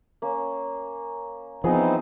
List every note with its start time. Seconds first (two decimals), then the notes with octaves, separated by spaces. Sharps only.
0.22 A#3 C#4
1.64 E3 F3 B3 C4 D#4 G#4 D#5